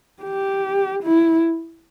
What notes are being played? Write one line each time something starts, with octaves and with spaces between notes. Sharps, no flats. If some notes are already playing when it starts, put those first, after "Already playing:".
G4
E4